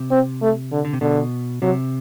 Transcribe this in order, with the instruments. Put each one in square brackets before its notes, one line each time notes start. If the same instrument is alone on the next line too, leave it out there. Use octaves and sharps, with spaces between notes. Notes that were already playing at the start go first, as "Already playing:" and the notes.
Already playing: [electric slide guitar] C3
[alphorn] C4
A3
D3
[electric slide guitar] D3
C3
[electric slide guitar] B2 [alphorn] D3
[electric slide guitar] C3 [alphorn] F#3